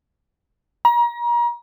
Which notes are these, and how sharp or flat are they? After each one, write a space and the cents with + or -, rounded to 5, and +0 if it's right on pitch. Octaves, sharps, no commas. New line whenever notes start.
A#5 +35